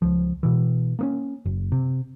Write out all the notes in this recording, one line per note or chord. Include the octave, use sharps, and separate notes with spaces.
C#2 F3
B2 E3
A#3 B3 C#4
F#1
C3